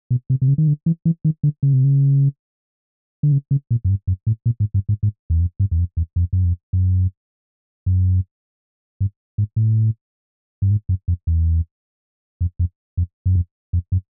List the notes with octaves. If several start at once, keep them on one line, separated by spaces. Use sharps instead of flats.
B2
C3
C3
C#3
D#3
D3
E3
E3
D#3
D3
C#3
C3
C#3
D3
C#3
C#3
A#2
F#2
G2
F#2
A2
A#2
G#2
G2
G#2
G#2
E2
F2
G2
E2
F2
E2
F2
F#2
F2
F#2
F#2
G2
G#2
A2
G2
G#2
F#2
F2
E2
F2
F2
F2
F#2
F2
F2
F#2